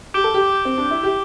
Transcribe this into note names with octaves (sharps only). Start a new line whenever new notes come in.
G4 D6 G6 D7 G7
A4
G4
C4
D4
E4
G4